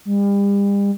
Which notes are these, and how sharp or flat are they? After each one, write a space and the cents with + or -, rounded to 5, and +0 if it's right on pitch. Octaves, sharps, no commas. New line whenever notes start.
G3 +40